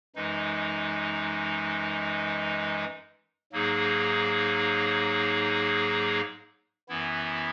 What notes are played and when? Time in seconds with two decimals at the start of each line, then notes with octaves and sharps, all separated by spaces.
0.16 F#2 E3 G#3 D#4
3.52 G#2 F#3 A#3 D#4 G#4
6.89 F#2 E3 B3 E4